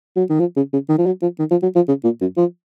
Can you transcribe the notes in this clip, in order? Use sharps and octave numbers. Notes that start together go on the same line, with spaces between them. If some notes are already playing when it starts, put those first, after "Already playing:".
F#3
D#3
F3
C#3
C#3
D#3
F3
F#3
F3
D#3
F3
F#3
F3
C#3
A#2
F#2
F3